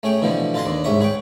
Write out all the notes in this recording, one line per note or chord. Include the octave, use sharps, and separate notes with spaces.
A3 C#4 G#4 G5
B2 D3 E3 F3 B3
F4 A4 B4 D#5 G#5 C6
D#2 D4
C2 G#2 C#4 E5 C#6 D#6
G#4 B4 C#5 G5